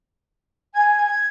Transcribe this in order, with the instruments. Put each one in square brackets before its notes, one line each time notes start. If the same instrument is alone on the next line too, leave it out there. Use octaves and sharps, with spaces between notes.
[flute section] G#5 [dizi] G#6